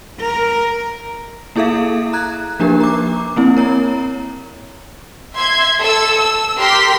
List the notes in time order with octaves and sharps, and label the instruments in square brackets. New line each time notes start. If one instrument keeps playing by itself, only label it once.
[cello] A#4
[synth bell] A#3 E4 G#4 A4 E5 F5
A#5 F#6 G#6
F3 A#3 D4 G4 A#4
A#5 D6
A#3 C4 E4
A#4 C#5 A#5
[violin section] E5 C6 G#6
A4 E6
E6
G4 A#4 C6 B6